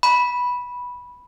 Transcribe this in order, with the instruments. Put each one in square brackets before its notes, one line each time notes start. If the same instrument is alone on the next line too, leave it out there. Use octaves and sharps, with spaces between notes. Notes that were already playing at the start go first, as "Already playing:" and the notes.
[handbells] B5